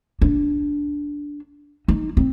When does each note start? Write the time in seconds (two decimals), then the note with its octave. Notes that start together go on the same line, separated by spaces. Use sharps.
0.22 D4
1.88 D#4
2.17 C4